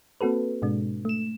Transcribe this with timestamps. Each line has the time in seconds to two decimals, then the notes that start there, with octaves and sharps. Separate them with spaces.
0.21 A#3 C4 F#4 A4 B4
0.62 G#2 B2 G#3 D4
1.05 A3 E7